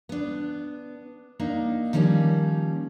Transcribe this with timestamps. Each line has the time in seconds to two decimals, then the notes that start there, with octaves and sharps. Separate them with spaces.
0.09 B3 D4
1.40 A#3 D4 D#4
1.93 D#3 F3 G3 A#3 C#4